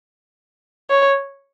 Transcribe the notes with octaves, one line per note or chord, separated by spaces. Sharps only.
C#5